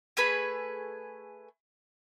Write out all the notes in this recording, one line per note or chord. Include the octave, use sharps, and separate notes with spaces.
A3 G#4 B4 B5